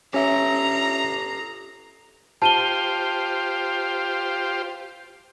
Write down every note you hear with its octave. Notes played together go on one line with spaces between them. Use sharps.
C#4 G4 A4 E5 A#5
F4 G4 C5 A5 D#7 G7